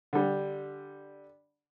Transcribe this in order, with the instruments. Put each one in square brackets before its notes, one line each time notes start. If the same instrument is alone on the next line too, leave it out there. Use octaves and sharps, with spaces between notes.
[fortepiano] D3 G3